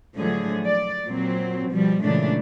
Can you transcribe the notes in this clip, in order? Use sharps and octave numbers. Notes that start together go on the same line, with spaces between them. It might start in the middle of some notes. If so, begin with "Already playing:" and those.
A2 D3 F3 F#3 A3 G#4
D5
A#2 F#3 C4
B2 F3 G3
A#2 C#3 E3 G#3 A3 D4